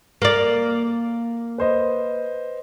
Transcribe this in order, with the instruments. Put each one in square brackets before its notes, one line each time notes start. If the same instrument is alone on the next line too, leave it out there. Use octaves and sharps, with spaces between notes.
[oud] A#3 D5
[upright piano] B4 C5 D#5